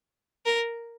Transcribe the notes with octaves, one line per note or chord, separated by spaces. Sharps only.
A#4